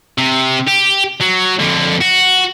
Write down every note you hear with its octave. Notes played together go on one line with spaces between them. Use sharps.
C3
G4
F#3
F2 D3
F#4